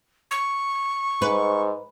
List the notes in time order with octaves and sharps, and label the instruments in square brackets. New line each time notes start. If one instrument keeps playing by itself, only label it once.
[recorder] C#6
[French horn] G#2 [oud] B4